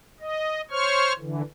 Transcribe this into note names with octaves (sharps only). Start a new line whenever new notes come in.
D#5
C5 C#5 C#6 F6
D3 E3